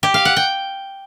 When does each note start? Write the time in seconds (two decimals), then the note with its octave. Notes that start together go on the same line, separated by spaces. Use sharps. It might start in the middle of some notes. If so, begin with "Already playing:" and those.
0.03 G4
0.14 F5
0.25 F#5
0.36 G5